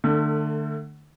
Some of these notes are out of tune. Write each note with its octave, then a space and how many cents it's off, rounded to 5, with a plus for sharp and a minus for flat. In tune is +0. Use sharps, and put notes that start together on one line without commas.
D3 +30 A3 +15